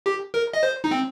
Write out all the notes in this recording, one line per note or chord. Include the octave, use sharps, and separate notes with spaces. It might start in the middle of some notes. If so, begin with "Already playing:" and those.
G4
A#4
D#5
C5
D#4
C4